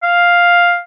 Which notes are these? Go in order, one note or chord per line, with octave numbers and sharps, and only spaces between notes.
F5